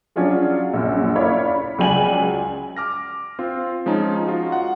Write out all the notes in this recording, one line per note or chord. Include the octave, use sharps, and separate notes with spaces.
F#3 C#4 D4 F4 G#4
A#1 F#2
E4 A#4 C#5 D5 F5 B5
B5
C#2 F#3 D5 G5 G#5 F#7
D6 F6 A#6
C4 F4
F3 G#3 C#4 D#4
F4 F#4
F#5